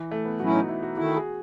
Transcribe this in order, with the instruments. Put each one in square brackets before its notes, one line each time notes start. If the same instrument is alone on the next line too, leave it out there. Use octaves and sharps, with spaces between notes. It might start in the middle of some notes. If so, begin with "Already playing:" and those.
Already playing: [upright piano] E3
A3
B3
[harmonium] A2 F#3 C#4 E4 [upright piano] F#4
[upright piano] D#4
E4
F#4
[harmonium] D#3 A3 E4 [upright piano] F#4
[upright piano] G#4